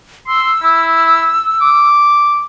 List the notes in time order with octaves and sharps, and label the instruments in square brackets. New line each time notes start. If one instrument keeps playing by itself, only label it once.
[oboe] C6 [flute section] E6
[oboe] E4
D6